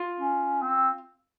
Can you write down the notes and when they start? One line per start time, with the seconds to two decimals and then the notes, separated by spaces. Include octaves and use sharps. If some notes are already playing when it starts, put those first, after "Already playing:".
Already playing: F4
0.20 C#4
0.62 C4